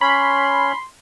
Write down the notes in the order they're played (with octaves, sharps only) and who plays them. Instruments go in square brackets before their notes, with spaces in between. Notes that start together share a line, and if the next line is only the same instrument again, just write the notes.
[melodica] C#4 C#5 [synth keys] B5 [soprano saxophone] C6